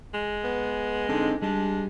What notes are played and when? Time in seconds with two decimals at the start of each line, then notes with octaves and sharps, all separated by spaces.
0.14 G#3
0.44 B3
1.09 D3 C4 D#4
1.42 G3 G#3 D4